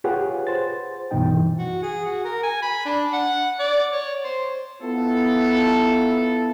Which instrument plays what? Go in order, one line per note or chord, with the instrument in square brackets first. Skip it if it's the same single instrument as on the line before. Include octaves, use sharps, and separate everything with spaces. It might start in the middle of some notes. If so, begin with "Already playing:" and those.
[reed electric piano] F4 G4 G#4 B4 C#5 F#5
C5 A6
C2 G2 B2 E3 D#4 G5
E3
[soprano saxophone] F#4
G#4
F#4
A#4
G#5
B5
D4
F#5
D5
C#5
C5
[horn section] B3 E4 F4 A4